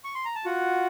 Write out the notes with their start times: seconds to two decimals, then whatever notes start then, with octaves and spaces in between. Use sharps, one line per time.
0.04 C#6
0.15 C6
0.25 A#5
0.35 A5
0.45 F4 F#4 F#5